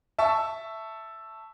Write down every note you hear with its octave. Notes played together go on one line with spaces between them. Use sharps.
E5 A5 C#6 E6